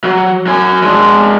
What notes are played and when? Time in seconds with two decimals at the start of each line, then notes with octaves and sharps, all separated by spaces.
0.04 F#3
0.46 F#3 G#5
0.83 G#3 D4